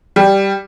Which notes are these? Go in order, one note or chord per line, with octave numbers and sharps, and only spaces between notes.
G3